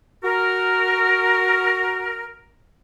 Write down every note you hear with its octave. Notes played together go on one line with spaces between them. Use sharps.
F#4 A#4